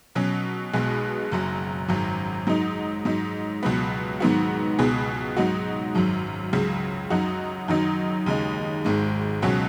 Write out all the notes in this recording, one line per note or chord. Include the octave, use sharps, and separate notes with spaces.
B2 F#3 C#4
B1 B2 G#3 B3 G#4
F#1 F#2 F#3
G#1 F#2 F#3
G#2 F#3 D#4
G#2 F#3 D#4
C#2 B2 F#3 B3
G#2 D#3 F#3 B3 F#4
C#2 B2 B3 G#4
G#2 F#3 D#4 F#4
G#1 F#2 F#3
C#2 C#3 F#3
F#2 F#3 D#4 F#4
F#2 D#3 F#3 D#4
D#2 C#3 G#3 D#4
G#1 G#2 G#3
C#2 B2 F#3 C#4 F#4